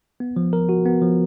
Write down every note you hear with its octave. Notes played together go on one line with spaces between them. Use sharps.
B3
F3
A#4
F#4
B3
F3